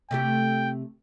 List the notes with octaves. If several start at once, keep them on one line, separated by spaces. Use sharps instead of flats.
C3 A3 G4 G5